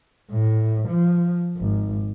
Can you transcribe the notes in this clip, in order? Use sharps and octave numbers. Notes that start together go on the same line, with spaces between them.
A2
F3
G#1